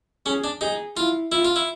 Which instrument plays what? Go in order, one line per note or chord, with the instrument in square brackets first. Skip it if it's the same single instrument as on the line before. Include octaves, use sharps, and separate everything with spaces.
[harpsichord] C#4 [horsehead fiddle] G#4
[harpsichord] D4
[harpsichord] D#4 [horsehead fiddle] G#4
[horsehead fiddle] E4 [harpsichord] F4
[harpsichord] E4 [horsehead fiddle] F4
[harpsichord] F4
E4